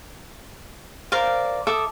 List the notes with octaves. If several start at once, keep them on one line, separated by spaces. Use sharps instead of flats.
A#4 C5 D5 F5
A4 E5 D6 D#6